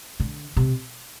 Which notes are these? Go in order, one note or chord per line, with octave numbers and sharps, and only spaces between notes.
D3
C3